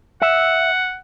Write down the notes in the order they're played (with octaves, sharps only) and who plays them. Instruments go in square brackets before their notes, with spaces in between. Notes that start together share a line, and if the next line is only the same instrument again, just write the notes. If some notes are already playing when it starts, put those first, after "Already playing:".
[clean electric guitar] E5 [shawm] F#5